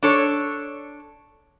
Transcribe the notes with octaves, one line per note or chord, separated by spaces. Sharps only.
D4 A4 C#5